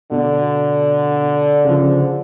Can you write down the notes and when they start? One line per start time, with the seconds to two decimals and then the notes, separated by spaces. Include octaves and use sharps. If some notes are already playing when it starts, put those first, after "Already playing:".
0.12 B2 D3
1.65 C#3 F3